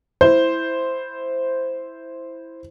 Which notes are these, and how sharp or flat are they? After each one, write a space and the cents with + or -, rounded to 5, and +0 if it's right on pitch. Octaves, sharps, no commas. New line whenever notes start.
E4 +0 C5 -5